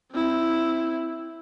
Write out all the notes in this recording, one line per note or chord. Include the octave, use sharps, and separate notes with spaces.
C4 E4